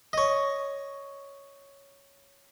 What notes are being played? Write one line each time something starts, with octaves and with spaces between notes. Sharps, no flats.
C#5 D#5